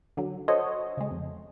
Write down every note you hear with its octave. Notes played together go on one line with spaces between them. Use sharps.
D3 F#3
F#4 A4 C5 C#5 D#5
C#3 G#3
F2